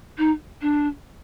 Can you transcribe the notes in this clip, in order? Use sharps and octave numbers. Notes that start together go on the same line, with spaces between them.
D#4
D4